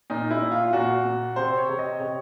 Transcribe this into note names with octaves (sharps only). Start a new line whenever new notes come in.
A#2 D#4
E4
A#2
F4
A#2 F#4
A#2
C3 C5
C#5
C3
D#5
C3 C#5